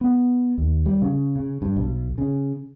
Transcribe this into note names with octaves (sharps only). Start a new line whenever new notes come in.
B3
D#2
G3
C#3
C#3
G2
B1
C#3